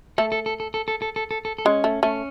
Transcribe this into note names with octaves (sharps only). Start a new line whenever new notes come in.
A3 A4
A4
A4
A4
A4
A4
A4
A4
A4
A4
A4
G#3 C#4
A3
A3 C#4